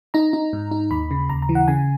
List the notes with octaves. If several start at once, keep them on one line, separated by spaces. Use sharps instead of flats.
D#4 A#5
D#4
G#2
D#4
D#2 B5
C#3
D#2 A#5
A#5
E3
F#5
C#3 G#5